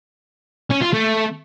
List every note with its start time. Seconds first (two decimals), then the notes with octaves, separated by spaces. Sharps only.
0.71 C#4
0.82 F4
0.94 A3